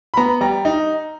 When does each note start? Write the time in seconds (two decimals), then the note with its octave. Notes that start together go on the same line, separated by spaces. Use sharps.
0.14 B5
0.17 B3 A#5
0.41 G3 A#5
0.65 D#4